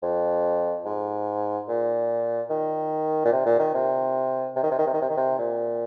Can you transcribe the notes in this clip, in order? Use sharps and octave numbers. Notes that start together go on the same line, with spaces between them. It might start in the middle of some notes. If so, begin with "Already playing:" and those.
F2
G#2
A#2
D#3
A#2
C3
A#2
D#3
C3
C3
D#3
C3
D#3
C3
D#3
C3
D#3
C3
A#2